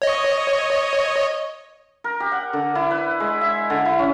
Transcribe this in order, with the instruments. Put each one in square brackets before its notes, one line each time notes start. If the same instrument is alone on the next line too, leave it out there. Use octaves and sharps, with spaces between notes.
[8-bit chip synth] C#5 D#5
[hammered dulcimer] A#4
G4
F#5
D3
E4
B4
G#3
E5
D3
E4
C#4